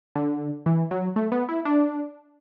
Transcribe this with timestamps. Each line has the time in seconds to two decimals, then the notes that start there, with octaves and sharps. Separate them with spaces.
0.15 D3
0.66 E3
0.91 F#3
1.16 A3
1.32 B3
1.49 E4
1.65 D4